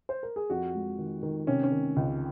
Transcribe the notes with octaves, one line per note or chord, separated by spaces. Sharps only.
C5
A#4
G#4
F2 F#4
G#3
D#3
D#3
C3 C#4
C#4
D#3
C#2